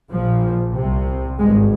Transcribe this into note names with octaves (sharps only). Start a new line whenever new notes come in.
A#1 A#2 F3
C2 C3
G#1 G2 G#3